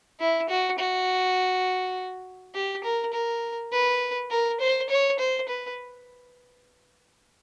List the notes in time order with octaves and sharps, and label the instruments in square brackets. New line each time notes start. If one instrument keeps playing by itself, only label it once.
[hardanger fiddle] E4
F#4
F#4
G4
A#4
A#4
B4
A#4
C5
C#5
C5
B4